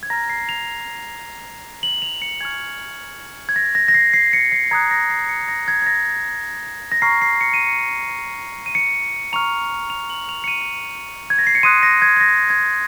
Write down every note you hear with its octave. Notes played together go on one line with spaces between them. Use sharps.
G#6
A#5 F6 A#6
C7
F7
F#7
F7
C#7
G#5 C#6 F6 G#6
G#6
A#6
A#6
A#6
C7
C7
C#7
C7
A#5 D#6 F#6 G#6
A#6
C7
C#7
A#6
G#6
G#6
A#6
A#6
A#5 C#6 F6 C7
C7
C#7
D#7
C#7
D#7
C#7
A#5 C#6 F6 F7
F7
F#7
F7
C#7
D#7
G#6
A#6
C7
C#7
C6 D#6 F#6 D#7
A#6
G#6
G#6
A#6
G#6